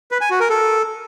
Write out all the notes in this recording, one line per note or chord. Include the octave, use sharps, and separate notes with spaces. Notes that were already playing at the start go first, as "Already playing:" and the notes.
B4
G#5
F#4
A#4
A4